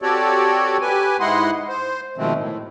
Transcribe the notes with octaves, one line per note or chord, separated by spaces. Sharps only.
C4 F#4 G4 A4 C#5 D5
G4 B4 G#5
G#2 G#3 E4 D#5 F#5 C6
C5
B2 D#3 F3 G#3 A3 C4
A2